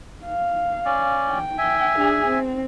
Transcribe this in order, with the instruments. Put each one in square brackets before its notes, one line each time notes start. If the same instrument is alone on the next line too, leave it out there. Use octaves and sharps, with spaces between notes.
[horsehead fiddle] F5
[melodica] C#4 D5
[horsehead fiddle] G5
[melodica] E5 G#5
[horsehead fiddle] D4 G#4
C4